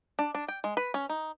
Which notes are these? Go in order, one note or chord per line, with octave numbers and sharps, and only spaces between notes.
D4
D4
G5
G#3
B4
C#4
D#4